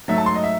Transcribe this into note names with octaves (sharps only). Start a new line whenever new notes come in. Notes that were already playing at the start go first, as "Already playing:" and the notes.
G#2 F#3 A3 E5
A5
C6
D#5
E5